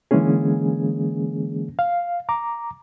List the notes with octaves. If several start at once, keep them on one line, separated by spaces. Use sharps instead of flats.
D3 E3 G#3 A#3 C#4 G#4
F5
A#5 D6